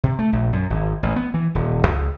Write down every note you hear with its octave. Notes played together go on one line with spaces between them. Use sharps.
C3
A3
A#1
F#2
G#1
A1
B3
E3
D#1
C#2